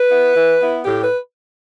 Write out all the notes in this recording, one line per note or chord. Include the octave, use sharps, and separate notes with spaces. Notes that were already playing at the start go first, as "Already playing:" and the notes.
Already playing: B4
B3 E4
E3
B3 E4
A2 G4
B4